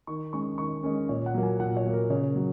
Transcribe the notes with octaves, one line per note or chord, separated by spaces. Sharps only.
D#3 C#6
G#3 C#4 C#6
D#3 C#6
G#3 C#4 A#4
A#2 C#5
F#5
F#3 A#3
G#5
A#2 F#5
C#5
F#3 A#3
A#4
C#3 C#5
F#3